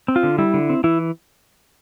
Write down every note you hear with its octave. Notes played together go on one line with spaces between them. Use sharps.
C4
F4
D3
G3 E4
D3
C4
E3 E4